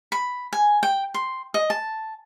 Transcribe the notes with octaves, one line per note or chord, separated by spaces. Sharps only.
B5
G#5
G5
C6
D#5
A5